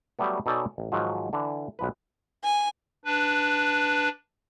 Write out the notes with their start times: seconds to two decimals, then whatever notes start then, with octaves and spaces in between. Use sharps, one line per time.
0.19 F#3 G3 A3 B3
0.46 B2 D#4 A4 C#5 D5 G#5
0.78 A1
0.92 G#2 D#3 F3 F#3
1.33 D3 E3 D4
1.79 B1 F3 B4
2.44 G#5
3.05 D4 B4